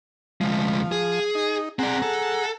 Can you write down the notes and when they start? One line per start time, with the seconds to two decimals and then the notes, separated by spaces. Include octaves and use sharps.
0.41 D2 F3 G#3
0.92 G#4
1.35 D#4
1.79 C4 G#4 D5 F#5 A#5
2.02 A4